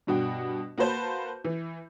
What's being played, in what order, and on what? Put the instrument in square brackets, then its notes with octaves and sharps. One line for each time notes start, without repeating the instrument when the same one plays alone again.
[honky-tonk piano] G2 B2 D4 F#4 G5
A#3 F#4 B4 C5 A5 G6
E3